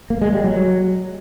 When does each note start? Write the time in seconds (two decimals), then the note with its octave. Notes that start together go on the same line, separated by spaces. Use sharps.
0.10 A#3
0.22 G#3
0.33 G3
0.44 F#3